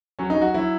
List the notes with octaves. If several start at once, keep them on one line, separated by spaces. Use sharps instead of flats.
F#3 C#4
D#4
F#3
F#4
F#3 E4